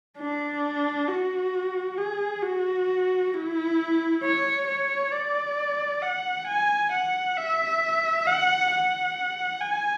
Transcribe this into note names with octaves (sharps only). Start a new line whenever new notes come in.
D4
F#4
G#4
F#4
E4
C#5
C#5
D5
F#5
G#5
F#5
E5
F#5
F#5
G#5